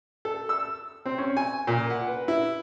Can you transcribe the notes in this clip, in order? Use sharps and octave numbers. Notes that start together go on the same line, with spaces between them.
A4
E6
C4
C#4
G#5
A#2
F#5
B4
E4